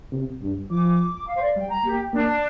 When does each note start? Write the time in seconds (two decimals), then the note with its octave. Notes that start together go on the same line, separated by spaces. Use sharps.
0.12 C3
0.42 G2
0.71 F3 D6
1.27 F5
1.35 C5
1.42 D5
1.56 G3 G5
1.70 A#5
1.84 A#3 G4
2.13 A#3 D4